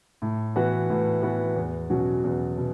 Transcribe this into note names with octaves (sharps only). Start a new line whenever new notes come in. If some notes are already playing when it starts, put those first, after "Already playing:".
A2
E3 B3 F#4
A2
E3 B3 F#4
E2
B2 F#3 C#4 F#4
E2
B2